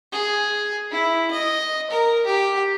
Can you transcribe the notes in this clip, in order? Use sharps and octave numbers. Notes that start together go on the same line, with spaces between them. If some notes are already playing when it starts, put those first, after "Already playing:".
G#4
E4
D#5
A#4
G4